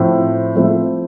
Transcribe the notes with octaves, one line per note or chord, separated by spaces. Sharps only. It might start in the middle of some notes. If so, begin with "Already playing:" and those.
Already playing: A2 F3 C4
F3 A3 C4 E4